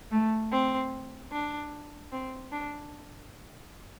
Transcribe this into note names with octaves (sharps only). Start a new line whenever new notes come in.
A3
C4
D4
C4
D4